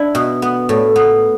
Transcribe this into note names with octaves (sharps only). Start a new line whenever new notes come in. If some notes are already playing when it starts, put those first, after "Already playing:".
Already playing: D4 E4
B2
B3
A2
B3